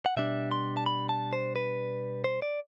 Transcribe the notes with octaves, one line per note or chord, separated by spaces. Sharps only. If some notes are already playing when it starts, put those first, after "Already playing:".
F#5
B2 G3 D4 E5
C6
A5
B5
A5
C5
B4
C5
D5